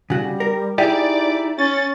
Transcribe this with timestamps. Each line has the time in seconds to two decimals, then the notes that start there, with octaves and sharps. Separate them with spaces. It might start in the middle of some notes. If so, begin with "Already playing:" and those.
0.10 C#3 G3 F#4
0.40 A#4
0.78 D#4 E4 G4 G#4 D5
1.59 C#4 A6